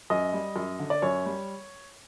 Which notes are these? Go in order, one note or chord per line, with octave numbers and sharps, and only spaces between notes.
F#2 D#5
G3
F#2
D3
D5
F#2 C#5
G3